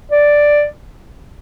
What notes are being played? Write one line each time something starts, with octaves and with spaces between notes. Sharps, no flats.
D5